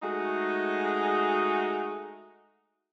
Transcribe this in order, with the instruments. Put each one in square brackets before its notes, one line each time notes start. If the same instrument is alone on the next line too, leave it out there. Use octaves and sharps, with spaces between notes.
[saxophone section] G#3 A3 D#4 F#4